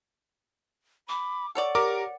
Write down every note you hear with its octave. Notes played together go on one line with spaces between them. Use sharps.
B5 D6
A4 C#5 D5 F#5
G4 A#4 D6